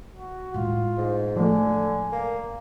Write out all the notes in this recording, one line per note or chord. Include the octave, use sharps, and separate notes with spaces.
F#4
A2 G#3 F4
G#2
D3 F3 A3 G#5
A#3